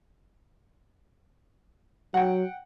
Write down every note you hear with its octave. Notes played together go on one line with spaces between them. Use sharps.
F#3 F#5 G5